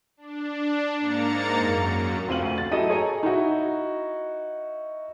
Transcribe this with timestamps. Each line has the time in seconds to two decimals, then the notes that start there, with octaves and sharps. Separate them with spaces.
0.17 D4
0.97 G#2 A#3 A#5 A6 C#7
1.57 F#2
2.28 F1 C4 F4 D#7 F#7
2.42 D2
2.58 A6
2.71 F#3 E4 G4 A4 D#5 D#7
2.88 G#4 A4 C#5 D#5 G#5 A#5
3.23 D#4 E4 F#4